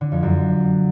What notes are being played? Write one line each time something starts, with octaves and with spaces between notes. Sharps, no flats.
D3
F2
F#2